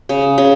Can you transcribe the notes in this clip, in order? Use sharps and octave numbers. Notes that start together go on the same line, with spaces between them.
C#3
C#3